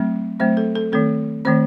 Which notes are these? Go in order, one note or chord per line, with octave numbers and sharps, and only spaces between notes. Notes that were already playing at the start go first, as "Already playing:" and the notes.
Already playing: F#3 A3 C4
F#3 A3 C4 C5
A4
A4
D#3 A3 C4 A4
D#3 A3 C4 C5